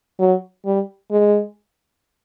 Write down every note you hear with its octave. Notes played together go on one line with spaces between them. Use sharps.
F#3
G3
G#3